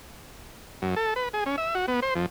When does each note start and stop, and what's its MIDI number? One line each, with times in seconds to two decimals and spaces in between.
0.82 0.95 42
0.96 1.14 69
1.16 1.29 71
1.33 1.44 68
1.46 1.56 61
1.58 1.75 76
1.75 1.86 66
1.88 2.00 59
2.02 2.14 72
2.15 2.26 41